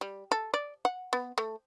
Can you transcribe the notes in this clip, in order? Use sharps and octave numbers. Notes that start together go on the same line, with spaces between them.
G3
A4
D5
F#5
B3
A3